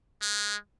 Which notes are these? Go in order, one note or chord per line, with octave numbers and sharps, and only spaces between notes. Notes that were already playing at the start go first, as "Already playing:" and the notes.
G#3